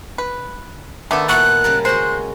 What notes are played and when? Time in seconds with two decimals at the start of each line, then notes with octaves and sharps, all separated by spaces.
0.18 B4
1.11 D3 D#3 A3 B3 D#4 A4
1.29 A#2 B3 E4 F#4 A4 F#6
1.64 C#3 G3 A#4
1.85 G#3 F#4 C5 F#6